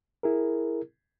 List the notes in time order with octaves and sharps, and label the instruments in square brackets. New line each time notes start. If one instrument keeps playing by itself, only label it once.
[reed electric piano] E4 G#4 A#4